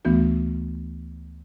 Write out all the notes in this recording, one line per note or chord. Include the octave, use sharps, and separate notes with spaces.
D2 E3 A3 B3 D4 F#4